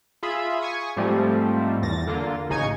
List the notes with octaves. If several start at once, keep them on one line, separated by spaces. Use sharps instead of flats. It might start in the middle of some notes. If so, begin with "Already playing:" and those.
F4 G#4 E5 B5
G#5 C#6 D#6
G#2 F3 G3 A3 C4
E2 A6 A#6
D3 A#3 F4
A1 C#3 D#4 G#5 C#6 G#6